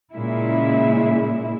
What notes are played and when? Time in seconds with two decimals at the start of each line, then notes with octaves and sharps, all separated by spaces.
0.13 A#2 C#3 G#3 E4